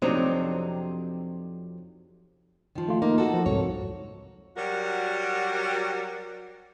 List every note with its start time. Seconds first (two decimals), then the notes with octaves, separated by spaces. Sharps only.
0.02 F2 C3 F#3 C4 D4 D#4
2.75 D#3 F3
2.88 A3 F4
3.02 A#3 D#4
3.18 F#4 A4
3.34 F3
3.46 C2 F2 G#2 C#5
4.56 F#3 G3 F#4 A#4